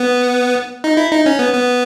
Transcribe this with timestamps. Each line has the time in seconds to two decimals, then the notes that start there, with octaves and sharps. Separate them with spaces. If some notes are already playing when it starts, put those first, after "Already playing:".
Already playing: B3
0.84 D#4
0.97 E4
1.11 D#4
1.26 C#4
1.39 B3
1.54 B3